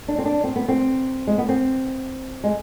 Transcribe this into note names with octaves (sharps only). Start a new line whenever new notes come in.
D4
C4
D4
C4
B3
C4
G#3
B3
C4
G#3